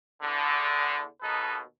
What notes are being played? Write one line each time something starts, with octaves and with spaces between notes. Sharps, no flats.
E2 D3
D#2 B2 D#4 A4 B4